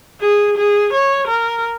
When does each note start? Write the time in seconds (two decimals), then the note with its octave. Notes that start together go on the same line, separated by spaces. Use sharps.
0.21 G#4
0.57 G#4
0.93 C#5
1.27 A#4